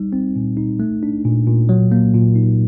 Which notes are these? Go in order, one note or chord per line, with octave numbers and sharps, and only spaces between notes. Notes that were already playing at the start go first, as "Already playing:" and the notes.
Already playing: G3 D#4
C4
A#2
D#4
A3
D4
A#2
A#2
F#3
A#3
A#2
D#4